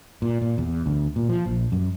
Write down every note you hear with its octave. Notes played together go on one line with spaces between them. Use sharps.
A#2
A#2
E2
D2
A#2
F3
A#1
F#2